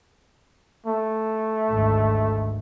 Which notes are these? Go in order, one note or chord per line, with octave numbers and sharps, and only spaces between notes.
A3
G#1 D2